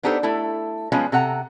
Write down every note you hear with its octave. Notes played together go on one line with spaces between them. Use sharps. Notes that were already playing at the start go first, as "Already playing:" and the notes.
B3 D4 D#4 G4 A4 C5
A3 E4 A4
F3 G3 G#3 B3 C#4 F4
C3 A4 F#5 A#5